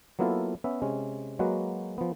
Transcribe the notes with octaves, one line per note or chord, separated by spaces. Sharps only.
F#3 A#3 B3 E4 F4 A4
B3 C#4 E5
C3 G#3 C#4
F#3 G#3 A#3 F#4 B4
F3 B3